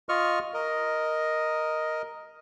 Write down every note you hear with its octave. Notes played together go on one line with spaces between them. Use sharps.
F4 D#5 C#6 F6
A#4 D#5